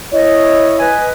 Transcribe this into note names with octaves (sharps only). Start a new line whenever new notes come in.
E4 C#5 D#5
B4 D#5 G#5